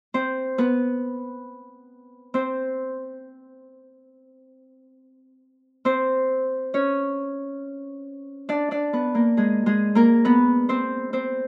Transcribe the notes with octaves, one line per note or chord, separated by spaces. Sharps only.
C4 C5
B3 B4
C4 C5
C4 C5
C#4 C#5
D4 D5
D4 D5
B3 B4
A#3 A#4
G#3 G#4
G#3 G#4
A#3 A#4
B3 B4
C4 C5
C4 C5